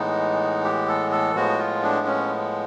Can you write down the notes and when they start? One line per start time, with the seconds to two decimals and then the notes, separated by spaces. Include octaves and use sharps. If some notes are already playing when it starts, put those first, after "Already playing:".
Already playing: A2 E3 G#3 B3 D#4
0.64 G4
0.88 A4
1.12 A4
1.35 A2 F3 G#3 B3 F#4
1.59 F4
1.83 D4
2.06 C#4